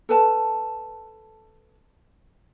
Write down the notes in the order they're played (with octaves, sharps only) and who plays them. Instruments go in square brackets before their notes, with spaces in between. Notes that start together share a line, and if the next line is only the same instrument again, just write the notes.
[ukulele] A4 B4 A5